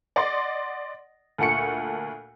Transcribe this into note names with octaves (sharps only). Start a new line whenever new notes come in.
D5 D#5 F#5 C6
D2 A#2 A4 F#5 C#6 C#7